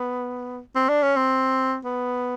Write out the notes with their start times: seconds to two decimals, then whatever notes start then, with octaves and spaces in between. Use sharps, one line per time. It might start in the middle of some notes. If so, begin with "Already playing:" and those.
Already playing: B3
0.75 C4
0.89 D4
1.03 C#4
1.16 C4
1.85 B3